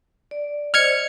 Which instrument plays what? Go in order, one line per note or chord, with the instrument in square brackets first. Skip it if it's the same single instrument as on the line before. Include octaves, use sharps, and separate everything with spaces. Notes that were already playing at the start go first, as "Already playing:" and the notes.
[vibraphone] D5
[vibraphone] C5 D5 D#5 [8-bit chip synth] F6 G#6 C#7